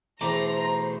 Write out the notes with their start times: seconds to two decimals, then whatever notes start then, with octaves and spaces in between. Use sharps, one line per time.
0.21 E2 B2 A3 C4 C5 A#5 D6